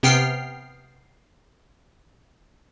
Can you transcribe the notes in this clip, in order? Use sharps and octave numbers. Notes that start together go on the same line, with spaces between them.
C3 B3 G5 F6 C7